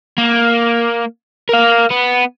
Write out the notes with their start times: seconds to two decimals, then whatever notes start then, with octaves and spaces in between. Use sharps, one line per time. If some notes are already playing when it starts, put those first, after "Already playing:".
0.18 A#3
1.49 A#4 F5
1.90 B3